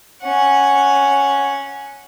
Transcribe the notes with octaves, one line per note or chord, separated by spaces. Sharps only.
C#4 F#5